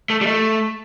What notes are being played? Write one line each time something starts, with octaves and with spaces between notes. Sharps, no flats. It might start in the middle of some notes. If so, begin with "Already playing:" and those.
A3
G3
A3